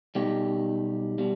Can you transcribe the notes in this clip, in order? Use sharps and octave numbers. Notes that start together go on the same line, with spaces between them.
B1 B2 G3 D#4 G4
B2 G3